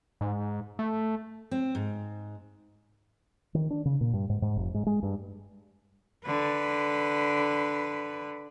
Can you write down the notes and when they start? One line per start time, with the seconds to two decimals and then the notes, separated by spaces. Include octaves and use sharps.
0.21 G#2
0.79 A3
1.51 C4
1.75 G#2
3.55 D#3
3.70 D4
3.85 C#3
4.01 A#2
4.13 G2
4.29 G#2
4.42 G#2
4.56 F1
4.74 G#2
4.86 G#3
5.03 G2
6.26 D3 B4